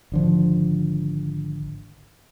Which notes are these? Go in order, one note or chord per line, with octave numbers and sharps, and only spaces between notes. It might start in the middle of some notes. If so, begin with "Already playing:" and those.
G#1 D3 F3